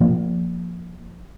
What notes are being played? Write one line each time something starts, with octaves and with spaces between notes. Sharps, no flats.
F3 A#3